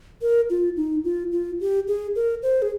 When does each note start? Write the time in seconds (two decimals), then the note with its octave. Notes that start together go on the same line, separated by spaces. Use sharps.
0.22 A#4
0.50 F4
0.77 D#4
1.04 F4
1.32 F4
1.61 G4
1.88 G#4
2.16 A#4
2.43 C5
2.62 G#4